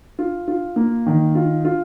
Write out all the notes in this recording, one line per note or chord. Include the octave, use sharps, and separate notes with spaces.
F4
F4
A#3
D#3
F4
F4